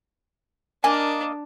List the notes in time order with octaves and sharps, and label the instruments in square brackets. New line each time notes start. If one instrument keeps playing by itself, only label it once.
[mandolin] A#3 D#5 [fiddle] D4 [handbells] G#5